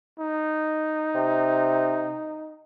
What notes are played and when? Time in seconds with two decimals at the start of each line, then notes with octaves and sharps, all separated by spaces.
0.19 D#4
1.15 C3